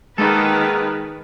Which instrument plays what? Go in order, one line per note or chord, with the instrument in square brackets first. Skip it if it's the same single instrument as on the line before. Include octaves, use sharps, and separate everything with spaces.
[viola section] D#3 B4 [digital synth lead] G#3 [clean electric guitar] A#3 B3 A4